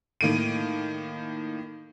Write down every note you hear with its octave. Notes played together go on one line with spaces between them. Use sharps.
A2 D#3 A#3 D7 D#7